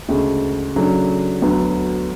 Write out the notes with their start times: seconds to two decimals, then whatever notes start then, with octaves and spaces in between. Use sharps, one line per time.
0.09 D2 C#3 G#3
0.75 C#3 F#3 A3 D4
1.42 D2 D3 F#3 B3